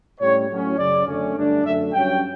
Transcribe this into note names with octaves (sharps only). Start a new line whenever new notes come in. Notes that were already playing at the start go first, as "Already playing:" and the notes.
A2 G3 C#4 C#5
A2 F#3 C#4
F#2 C#3 F#3 D5
F#2 D3 A3 C#4
G2 D3 A3 D4
F#2 D3 A3 D4 E5
G2 F#3 C#4 G5